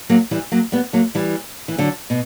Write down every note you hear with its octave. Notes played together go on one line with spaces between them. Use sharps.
F#3 A#3
E3 G3
F#3 A#3
G3 B3
F#3 A#3
E3 G3
E3
D3 F#3
B2